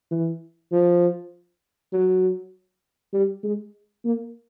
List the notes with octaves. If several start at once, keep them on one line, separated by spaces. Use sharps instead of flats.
E3
F3
F#3
G3
G#3
A#3